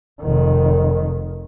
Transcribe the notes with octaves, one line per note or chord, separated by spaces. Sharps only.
F1 D#3